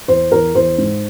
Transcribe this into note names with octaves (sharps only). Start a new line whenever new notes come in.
E2 C5
E2 A#4
E2 C5
G#2